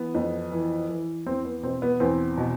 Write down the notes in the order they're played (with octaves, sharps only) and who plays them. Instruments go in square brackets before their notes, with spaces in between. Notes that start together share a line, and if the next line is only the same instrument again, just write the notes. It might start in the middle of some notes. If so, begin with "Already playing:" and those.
Already playing: [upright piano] E3 B3
F2
E3
E3
E2 C4
B3
B2 C4
B3
E2 C4
B2